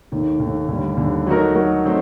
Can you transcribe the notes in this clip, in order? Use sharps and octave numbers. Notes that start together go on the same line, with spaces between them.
D#2 D#3 A3
D#2 D#3 A3
D#2 D3 G3
D#2 D3 G3
F#3 A3 D#4 F#4 A#4
F#3 A3 D#4 F#4 A#4
F#3 A3 C4 D#4